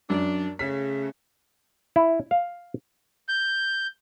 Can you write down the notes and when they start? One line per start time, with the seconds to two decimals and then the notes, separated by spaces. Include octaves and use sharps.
0.10 F#2 D4
0.59 C#3 A3 B6
1.96 E4
2.31 F5
3.29 G6